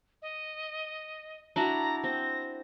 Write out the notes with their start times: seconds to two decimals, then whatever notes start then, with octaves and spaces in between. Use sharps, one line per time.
0.22 D#5
1.56 D4 E4 F#4 A#5
2.04 C4 A#6